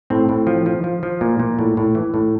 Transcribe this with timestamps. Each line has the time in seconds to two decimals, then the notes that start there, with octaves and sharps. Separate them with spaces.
0.10 A2 C4
0.29 A2
0.47 F3
0.66 F3
0.84 F3
1.03 F3
1.21 A#2
1.40 A#2
1.59 A2
1.77 A2
1.95 E3
2.14 A2